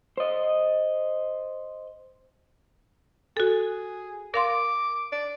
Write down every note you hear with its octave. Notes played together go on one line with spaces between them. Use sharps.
C5 D#5
F#4 G#4 A4
A#4 F5 C6 D6
D5